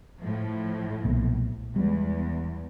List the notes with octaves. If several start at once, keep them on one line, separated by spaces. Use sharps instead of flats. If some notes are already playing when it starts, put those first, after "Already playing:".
A2 F3
B1 A#2
E2 G3 G#3